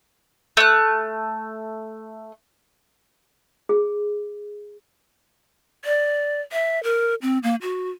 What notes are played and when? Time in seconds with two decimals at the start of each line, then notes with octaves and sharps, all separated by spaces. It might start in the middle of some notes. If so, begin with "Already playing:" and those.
0.57 A3 F#6
3.69 G#4
5.85 D5
6.52 E5
6.83 A#4
7.22 C4
7.43 A#3
7.62 F#4